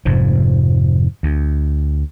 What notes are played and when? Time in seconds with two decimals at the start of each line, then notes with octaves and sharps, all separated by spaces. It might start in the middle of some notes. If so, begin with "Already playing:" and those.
0.05 F1 G#2 F3
1.23 D2